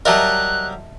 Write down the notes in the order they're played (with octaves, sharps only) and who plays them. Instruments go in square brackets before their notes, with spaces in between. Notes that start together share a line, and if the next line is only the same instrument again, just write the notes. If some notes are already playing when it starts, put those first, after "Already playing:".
[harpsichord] F#3 G3 A#4 [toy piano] D#5 E5 A5 [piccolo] F#6